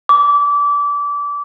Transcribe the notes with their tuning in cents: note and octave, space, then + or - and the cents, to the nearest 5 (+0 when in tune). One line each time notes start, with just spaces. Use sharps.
D6 -25